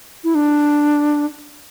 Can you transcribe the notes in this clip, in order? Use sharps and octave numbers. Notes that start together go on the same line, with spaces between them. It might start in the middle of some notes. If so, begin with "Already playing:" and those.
E4
D4